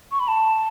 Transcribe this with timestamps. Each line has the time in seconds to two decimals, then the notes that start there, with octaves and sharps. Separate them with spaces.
0.11 C#6
0.20 B5
0.28 A5